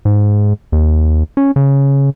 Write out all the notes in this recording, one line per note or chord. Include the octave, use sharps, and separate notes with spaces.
G#2
D#2
C#4
C#3